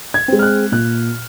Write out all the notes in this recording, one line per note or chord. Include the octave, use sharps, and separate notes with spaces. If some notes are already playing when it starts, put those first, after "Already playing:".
G#6
G#3 C4
F6
F#6
A#2 F#6